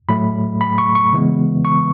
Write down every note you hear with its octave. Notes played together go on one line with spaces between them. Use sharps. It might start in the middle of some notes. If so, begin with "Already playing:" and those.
A2 F#3 A3 B5
B5
C#6
C#6
C#3 E3 G#3 B3
C#6